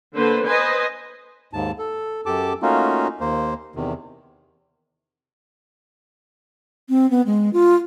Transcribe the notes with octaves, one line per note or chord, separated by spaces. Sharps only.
D3 A#3 B4 C5
B4 C5 D#5 G#5
D#2 G#2 A5
A4
F#2 G4 A4 A5 D6
A3 A#3 C#4 D#4 F4 F#4
D#2 A#3 C5
E2 C3 D#3
C4
B3
G#3
F4